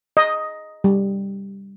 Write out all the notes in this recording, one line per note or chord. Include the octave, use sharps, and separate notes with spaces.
D#5
G3